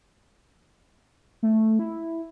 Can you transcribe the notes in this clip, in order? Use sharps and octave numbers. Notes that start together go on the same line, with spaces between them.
A3
E4